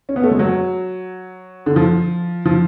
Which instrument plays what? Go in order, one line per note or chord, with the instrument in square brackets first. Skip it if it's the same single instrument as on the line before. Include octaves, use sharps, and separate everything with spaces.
[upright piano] C#4
B3
A3
G#3
F#3
D3
F3
F3